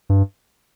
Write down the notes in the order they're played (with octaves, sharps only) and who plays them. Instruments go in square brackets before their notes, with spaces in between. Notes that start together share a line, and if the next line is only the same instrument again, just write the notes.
[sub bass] G2